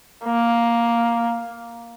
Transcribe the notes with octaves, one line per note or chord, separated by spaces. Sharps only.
A#3